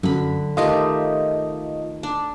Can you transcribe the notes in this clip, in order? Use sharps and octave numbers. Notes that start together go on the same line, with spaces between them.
F#2 D3 B5
D#3 A3 F4 G4 D#5
D4